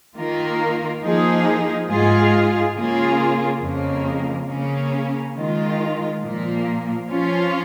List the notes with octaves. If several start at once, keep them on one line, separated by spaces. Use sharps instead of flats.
D#3 A#3 F4 A#4
F3 A#3 D#4 G#4
G#2 G#3 F4 G#4
C#3 A#3 F4 G#4
F2 C#3 A#3
C#3 A#3 C#4
D#3 G#3 F4
A#2 F3 A#3
F3 C#4 F4